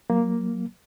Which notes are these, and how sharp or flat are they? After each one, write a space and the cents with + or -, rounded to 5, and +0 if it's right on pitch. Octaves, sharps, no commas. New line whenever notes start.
F#3 +0 A#3 +0